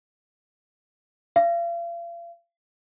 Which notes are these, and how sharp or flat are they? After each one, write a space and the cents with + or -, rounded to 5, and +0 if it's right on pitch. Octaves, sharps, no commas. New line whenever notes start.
F5 -40